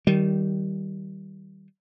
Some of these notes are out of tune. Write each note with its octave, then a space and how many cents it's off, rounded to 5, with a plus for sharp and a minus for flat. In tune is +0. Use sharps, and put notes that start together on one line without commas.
D#3 +0 G3 -25